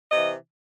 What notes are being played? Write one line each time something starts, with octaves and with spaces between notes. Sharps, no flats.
C3 E3 D#5